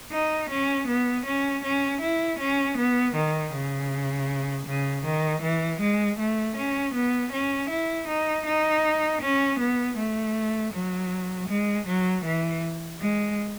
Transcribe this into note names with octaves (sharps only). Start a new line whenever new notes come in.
D#4
C#4
B3
C#4
C#4
E4
C#4
B3
D#3
C#3
C#3
D#3
E3
G#3
A3
C#4
B3
C#4
E4
D#4
D#4
C#4
B3
A3
F#3
G#3
F#3
E3
G#3